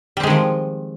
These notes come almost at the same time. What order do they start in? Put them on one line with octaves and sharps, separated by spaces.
G3 C4 G#3 D#3 F3